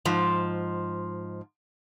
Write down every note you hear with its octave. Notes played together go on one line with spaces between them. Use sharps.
G#2 F3